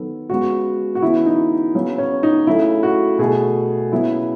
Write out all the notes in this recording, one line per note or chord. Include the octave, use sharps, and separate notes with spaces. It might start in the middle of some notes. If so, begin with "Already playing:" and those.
Already playing: D#3 F#3 B3 A4
C#3 G#3 B3 F#4
F#4
C#3 E3 B3 E4
D#4
C#3 F#3 B3
C#4
D#4
C#3 F#3 A3 E4
F#4
B2 A3 G#4
C#3 F#3 B3 E4